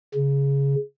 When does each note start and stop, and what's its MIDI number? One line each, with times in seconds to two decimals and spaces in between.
0.15 0.75 49